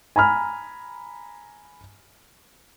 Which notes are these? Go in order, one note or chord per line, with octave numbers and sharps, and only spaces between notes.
G#5 A#5 B5 F6